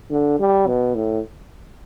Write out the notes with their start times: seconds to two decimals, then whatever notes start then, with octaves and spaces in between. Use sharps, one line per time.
0.10 D3
0.40 G3
0.67 B2
0.95 A2